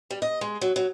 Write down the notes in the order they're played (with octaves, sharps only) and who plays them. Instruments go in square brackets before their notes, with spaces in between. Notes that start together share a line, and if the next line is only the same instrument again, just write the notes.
[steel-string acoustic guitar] G3
D#5
G#3
F#3
F#3